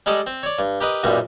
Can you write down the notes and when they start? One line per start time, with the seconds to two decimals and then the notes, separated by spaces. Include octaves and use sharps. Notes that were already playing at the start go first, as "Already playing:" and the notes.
0.06 G3 G#3 G4 A4 D5 D#5
0.27 C4
0.43 C#5 D5
0.59 G2
0.80 G4 A#4 B4 D#5
1.04 B1 F#2 A#2 G3